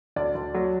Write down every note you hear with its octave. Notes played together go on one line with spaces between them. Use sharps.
D2 D5
D2
F#3